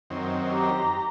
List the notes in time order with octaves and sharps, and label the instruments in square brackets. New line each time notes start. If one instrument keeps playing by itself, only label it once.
[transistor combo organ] F#2 D#3 C4
[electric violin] G4 A#5